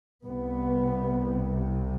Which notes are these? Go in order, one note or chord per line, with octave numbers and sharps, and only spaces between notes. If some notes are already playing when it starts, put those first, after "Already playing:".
C2 C3 B3